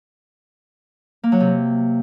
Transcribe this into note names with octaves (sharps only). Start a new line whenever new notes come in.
A#3
F#3
C3